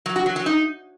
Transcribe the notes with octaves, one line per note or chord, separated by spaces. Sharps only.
F#3
F#4
F#3
F#3
D#4